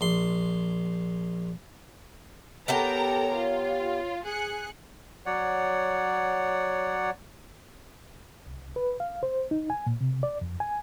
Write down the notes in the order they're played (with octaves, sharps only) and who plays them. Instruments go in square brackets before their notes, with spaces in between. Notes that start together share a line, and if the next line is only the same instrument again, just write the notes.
[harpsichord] A#1 C6
[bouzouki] B3 G4 G5 [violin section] A4 A#4 A#5 [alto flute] C#5
[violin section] F4
G#4 F#6 C#7
[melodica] F#3 C#5 D5 F#5
[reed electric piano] C2
B4
F5
C5
D#4
G#5
A#2
C3
D5
F2
G#5